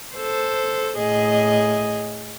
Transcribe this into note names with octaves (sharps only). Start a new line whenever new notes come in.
A4 C5
A2 G#4 D#5